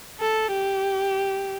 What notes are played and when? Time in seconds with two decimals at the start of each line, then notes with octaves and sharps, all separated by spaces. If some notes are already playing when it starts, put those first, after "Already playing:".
0.21 A4
0.53 G4